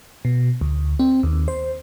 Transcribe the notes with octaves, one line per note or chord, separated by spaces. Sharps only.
B2
D2
C4
D#2
C5